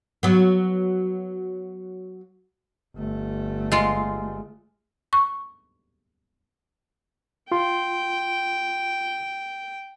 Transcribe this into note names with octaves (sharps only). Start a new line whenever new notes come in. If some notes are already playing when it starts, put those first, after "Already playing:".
F#3 B3
G1 A3
G#3 F4
C#6
F4 G5 C6